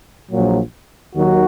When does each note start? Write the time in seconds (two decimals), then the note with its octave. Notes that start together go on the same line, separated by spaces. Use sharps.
0.30 A#1 A#2 F#3
1.14 D#2 D#3 F#3 F#4